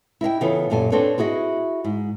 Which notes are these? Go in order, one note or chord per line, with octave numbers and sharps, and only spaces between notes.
E4 D#5 F5 G5
C#3 E3 B3 F4 A4
F#2 A#2 G3 A4 G#5
C4 D4 A4 B4 C#5
E4 F#4 G#4 D#5
G#2